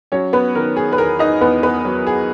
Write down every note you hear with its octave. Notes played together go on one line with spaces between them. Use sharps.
F#3 C#4 C#5
B3 B4
D#3 A#4
G#4
B4
E2 A#4
D#4 D#5
E2 B3 B4
B3 B4
F#3
G#4